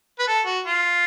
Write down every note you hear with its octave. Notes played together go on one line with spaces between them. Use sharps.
B4
A4
F#4
F4